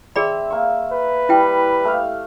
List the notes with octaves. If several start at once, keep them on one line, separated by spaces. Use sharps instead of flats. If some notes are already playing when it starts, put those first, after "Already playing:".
C4 G#4 D5 E5 B5
A#3 C#6
B4
G3 E4 G5
A3 G4 F5